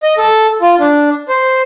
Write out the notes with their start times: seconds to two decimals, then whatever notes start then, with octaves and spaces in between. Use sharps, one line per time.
0.03 D#5
0.18 A4
0.62 F4
0.79 D4
1.29 C5